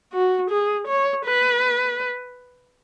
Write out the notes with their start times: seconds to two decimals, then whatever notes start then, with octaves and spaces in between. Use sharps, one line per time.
0.13 F#4
0.50 G#4
0.87 C#5
1.25 B4